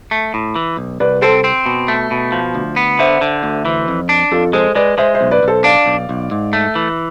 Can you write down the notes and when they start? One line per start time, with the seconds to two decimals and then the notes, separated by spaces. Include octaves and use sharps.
0.11 A3
0.34 A2
0.56 E3
0.77 B1
1.00 C2 B4 D5
1.22 C4 A4 C5
1.44 C4
1.66 B2
1.88 A3
2.11 B2
2.32 F3
2.55 D2
2.76 B3
2.99 D3 C5 E5
3.21 D3
3.43 D2
3.65 E3
3.88 F2
4.09 D4
4.32 F2 F4 A4
4.53 G#3 A4 C5
4.75 G#3 B4 D5
4.98 G#3 C5 E5
5.14 C5 E5
5.21 B1
5.31 B4 D5
5.43 B1 A4 C5
5.64 D4 D5 F5
5.86 B1
6.09 B1
6.31 G#2
6.53 A3
6.75 E3